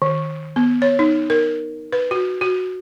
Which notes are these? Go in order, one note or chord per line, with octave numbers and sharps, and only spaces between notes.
D#3
B3
C#5
D#4
A#4
B4
F#4
F#4